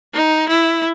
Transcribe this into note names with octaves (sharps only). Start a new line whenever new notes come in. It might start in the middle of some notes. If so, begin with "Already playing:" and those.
D#4
E4